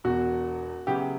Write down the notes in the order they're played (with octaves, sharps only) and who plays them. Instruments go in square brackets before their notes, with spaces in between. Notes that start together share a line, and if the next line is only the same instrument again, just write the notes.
[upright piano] E1 E2 B2 [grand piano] F#4
[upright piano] C#3 F#3 B3 E4 B4 [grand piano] G4